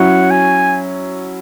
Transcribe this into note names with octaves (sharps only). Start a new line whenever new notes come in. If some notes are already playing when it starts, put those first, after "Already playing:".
Already playing: F#3 C#4 E4 F#5
G#5